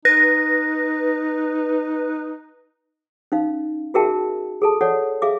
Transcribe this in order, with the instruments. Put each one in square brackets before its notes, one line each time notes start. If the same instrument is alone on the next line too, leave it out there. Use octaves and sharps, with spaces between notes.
[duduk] D#4 [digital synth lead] B4 [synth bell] A#6
[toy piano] C#4 D#4 F5
F#4 G#4 A#4 E5 G5 A5
G#4 A4 A5
A4 C#5 D5 F#5
G#4 E5 F5 D6